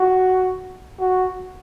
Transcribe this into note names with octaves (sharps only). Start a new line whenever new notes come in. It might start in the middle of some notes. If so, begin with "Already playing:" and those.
Already playing: F#4
F#4